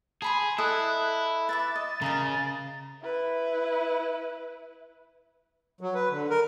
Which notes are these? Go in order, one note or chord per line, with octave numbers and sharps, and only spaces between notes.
G#4 A5 B5 C6
E4 A4 D#5 D#6 F#6
B4 E5 D6 A6
D#5
C#3 A#4 D#5 A#5
E4 B4
F#3
B4
D3
A#4